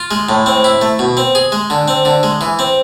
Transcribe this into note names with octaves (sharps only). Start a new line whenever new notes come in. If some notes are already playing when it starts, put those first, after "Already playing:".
Already playing: F4
G#3
A2
C4
E4
A3
B2
C4
G#4
G#3
D3
C4
D3
G#3
E3
C4